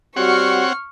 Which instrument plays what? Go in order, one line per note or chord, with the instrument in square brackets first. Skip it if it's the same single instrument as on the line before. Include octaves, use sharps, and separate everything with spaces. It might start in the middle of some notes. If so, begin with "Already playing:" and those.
[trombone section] G3 F#4 [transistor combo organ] C4 C#5 F#5 [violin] C#6 F6